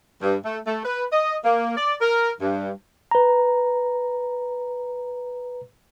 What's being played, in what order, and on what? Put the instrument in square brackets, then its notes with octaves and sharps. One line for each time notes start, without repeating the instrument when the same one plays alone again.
[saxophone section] G2
A3
A3
B4
D#5
A#3
D5
A#4
G2
[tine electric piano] B4 A#5